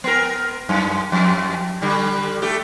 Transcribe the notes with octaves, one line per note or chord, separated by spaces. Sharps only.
B3 A#4
F#2
F2
D3 G3
A3 G4